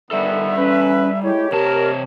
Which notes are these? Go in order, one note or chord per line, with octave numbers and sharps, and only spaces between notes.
D3 D#3 G3 B3 A4 E5
E2 C#4 B4
G#3 A3 E4 G4 C#5
C3 G4 A#4 A5